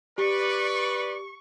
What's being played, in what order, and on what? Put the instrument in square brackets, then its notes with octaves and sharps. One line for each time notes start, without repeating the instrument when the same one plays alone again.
[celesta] G4 [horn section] B4 D5 [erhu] C#6